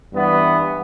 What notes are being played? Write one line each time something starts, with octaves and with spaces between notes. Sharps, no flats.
G2 E3 B3